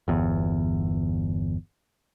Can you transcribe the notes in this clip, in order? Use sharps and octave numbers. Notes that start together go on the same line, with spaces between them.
G1 E2